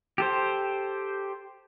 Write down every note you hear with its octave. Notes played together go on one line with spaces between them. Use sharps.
G4 A4 C5